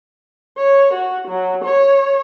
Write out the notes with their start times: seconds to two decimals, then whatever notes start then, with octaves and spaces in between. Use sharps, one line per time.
0.58 C#5
0.94 F#4
1.28 F#3
1.64 C#5